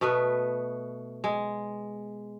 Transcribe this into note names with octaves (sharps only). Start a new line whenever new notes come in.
B2 A3 B3 B4
G#3